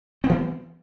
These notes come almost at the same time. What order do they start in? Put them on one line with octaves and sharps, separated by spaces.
C4 B3 E3